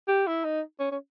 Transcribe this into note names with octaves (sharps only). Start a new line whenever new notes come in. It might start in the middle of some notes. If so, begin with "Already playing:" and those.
G4
E4
D#4
C#4
C#4